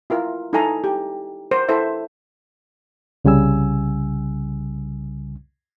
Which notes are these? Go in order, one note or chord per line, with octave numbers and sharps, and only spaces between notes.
E4 F4 A#4
D#4 E4 A4 G#5 A#5
G4
A#4 C5
E4 A4 C5 E5
C2 C#3 G3 G#5 E6